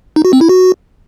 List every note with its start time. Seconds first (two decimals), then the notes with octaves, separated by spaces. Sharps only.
0.16 D#4
0.25 F#4
0.33 C4
0.41 E4
0.49 F#4